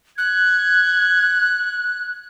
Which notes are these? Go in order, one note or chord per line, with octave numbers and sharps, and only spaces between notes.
F#6 G#6